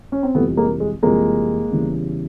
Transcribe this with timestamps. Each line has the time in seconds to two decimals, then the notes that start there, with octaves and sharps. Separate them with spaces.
0.12 C#4
0.23 C4
0.35 F2 C3 E3 G3 A3 B3
0.57 G#3 A#3
0.80 G#3
1.03 F2 C3 E3 G3 G#3 A#3
1.70 E2 C#3 E3 G3